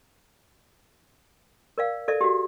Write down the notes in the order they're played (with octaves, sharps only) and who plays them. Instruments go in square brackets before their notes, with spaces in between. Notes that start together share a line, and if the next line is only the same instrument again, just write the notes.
[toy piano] A#4 D5 F5
A4 D5 E5
F#4 G4